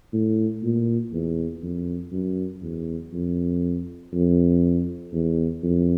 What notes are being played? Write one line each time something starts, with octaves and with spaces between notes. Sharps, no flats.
A2
A#2
E2
F2
F#2
E2
F2
F2
E2
F2